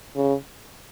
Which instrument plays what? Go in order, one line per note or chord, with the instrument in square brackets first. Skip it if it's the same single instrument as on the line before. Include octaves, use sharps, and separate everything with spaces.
[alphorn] C#3